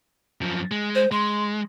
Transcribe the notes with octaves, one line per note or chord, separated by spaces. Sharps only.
F#2 F3
G#3
C5
G#3 C6